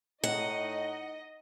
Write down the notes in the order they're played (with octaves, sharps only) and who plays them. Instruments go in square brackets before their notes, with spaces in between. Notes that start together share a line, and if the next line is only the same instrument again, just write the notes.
[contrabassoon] A2 [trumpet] D#4 [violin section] D#5 [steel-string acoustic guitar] F#5